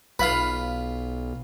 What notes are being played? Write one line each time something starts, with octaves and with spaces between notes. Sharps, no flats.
B1 F4 B4 F5 B5